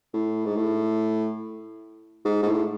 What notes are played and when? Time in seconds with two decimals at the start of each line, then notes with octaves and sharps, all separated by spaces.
0.14 A2
0.45 G#2
0.56 A2
2.25 G#2
2.43 G#2
2.46 A2